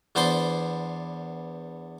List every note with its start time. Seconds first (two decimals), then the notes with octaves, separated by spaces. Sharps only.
0.15 E2 B3 D4 C5 A5 C6